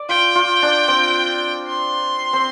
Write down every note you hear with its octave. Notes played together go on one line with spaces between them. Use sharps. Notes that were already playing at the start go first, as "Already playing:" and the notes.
Already playing: D5
F4 G5
F4
D4
C4
C6
C4